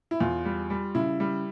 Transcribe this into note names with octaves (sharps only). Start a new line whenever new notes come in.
E4
E2 F4
G3
G3
C#3 E4
G3